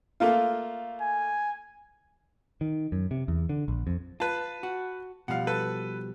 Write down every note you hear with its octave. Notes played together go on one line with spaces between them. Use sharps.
A3 A#3 F4
G#5
D#3
F#2
C3
E2
D3
A#1
F2
F4 B4 A5
F#4
B2 F3 G3 F5 F#5
A4 B4